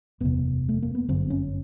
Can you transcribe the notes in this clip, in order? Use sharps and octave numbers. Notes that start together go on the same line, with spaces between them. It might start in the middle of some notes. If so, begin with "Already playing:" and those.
F#1 E2 C3 B3
A3
A#3
B3
G1 F#2 D3 C4
C#4